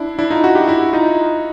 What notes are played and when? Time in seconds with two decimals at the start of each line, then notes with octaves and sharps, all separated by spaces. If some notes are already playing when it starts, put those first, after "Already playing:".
Already playing: D4 E4
0.19 D4 E4
0.30 D#4 F4
0.44 E4 F#4
0.55 F4 G4
0.68 E4 F#4
0.93 D#4 F4